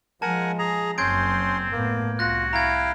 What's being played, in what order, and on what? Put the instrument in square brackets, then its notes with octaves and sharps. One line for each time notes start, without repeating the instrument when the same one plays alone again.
[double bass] F3 G#3 [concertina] A#4 F#5 G#5 [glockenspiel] A5
[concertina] G#4 A#5
[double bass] F#1 F#2 [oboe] C4 [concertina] C#4 C6 [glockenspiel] G6 G#6 D7
[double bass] A2 B3 [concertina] A#3
[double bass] C2 [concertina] F4 [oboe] F#4 [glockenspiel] F#6 A#6
[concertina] E4 F5 G5 [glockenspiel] A#5 G#6